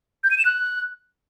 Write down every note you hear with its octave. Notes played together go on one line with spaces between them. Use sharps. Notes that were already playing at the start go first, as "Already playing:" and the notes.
G6
D#7
E7
F#6